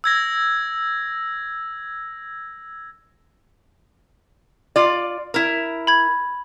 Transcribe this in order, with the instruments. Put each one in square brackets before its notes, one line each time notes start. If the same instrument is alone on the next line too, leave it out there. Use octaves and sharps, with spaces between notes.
[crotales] E6 G#6 A#6
[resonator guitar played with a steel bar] F4 D5
E4 A#4
[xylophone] B5 G#6